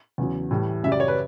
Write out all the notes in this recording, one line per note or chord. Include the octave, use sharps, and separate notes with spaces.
E2 C#3 F#3
A2 E3 G3
F#2 C#3 G3 E5
D5
C#5
B4